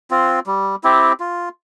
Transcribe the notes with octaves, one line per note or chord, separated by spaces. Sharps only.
C4 F4
G3
C4 E4 G4
F4